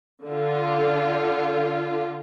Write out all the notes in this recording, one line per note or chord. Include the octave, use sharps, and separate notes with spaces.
D3 F4